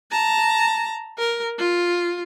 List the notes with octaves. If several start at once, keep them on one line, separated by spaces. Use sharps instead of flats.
A5 A#5
A#4
F4